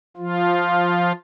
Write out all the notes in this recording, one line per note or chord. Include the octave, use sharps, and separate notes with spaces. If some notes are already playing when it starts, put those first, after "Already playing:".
F3 F4